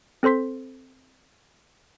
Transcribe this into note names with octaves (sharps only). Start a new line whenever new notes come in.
C4 A4 C5 C6 B6